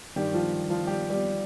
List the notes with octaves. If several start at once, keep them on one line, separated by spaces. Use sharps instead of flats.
G2 D#3 G3 G4
F3 F4
F3 F4
G3 G4
G3 G4